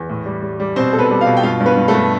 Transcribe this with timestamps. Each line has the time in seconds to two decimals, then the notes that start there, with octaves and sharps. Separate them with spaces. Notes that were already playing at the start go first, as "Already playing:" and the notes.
Already playing: E2
0.09 A2
0.26 G3
0.42 G3
0.60 G3
0.76 B2 C4 C5
0.93 B2 A4
0.99 B3 B4
1.10 G3
1.21 F4 F5
1.26 B2
1.37 G5
1.43 G2 F4 F5
1.60 G2
1.66 B3 B4
1.77 G2
1.88 A3 A4
1.94 G2